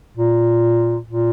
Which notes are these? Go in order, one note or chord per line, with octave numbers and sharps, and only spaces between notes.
A#2
A#2